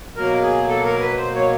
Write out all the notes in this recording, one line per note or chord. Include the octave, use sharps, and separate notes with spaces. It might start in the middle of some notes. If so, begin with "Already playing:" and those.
B2 F#3 A#3 A#4
G#4
A4
A#4
B4
C5
C#5